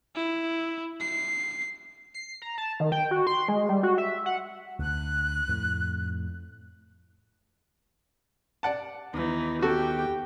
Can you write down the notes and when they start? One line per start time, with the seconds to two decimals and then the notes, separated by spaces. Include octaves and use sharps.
0.15 E4
1.00 C7
2.14 C7
2.42 A#5
2.58 A5
2.80 D#3
2.92 G5
3.11 F#4
3.27 C6
3.48 G#3
3.69 G3
3.83 F#4
3.98 E5
4.26 F#5
4.79 D2 F#6
5.48 F2 A2
8.63 D5 F#5 A5
9.14 D#2 E3 B3 D#4
9.62 F#4 G4 A4 G5